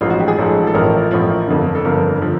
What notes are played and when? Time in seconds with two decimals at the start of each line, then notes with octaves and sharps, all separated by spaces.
0.01 A1 G#2 F3 F4
0.10 F#4
0.19 G4
0.28 G#4
0.38 A1 G#2 F3 A4
0.67 A4
0.74 A1 A2 F3 A#4
1.11 A1 A2 F3
1.48 G1 F2 D3
1.75 A4
1.85 G1 F2 D3 A#4
2.22 D3 F3